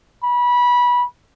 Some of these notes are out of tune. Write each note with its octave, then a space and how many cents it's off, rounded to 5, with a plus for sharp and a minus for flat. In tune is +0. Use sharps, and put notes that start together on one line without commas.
B5 -20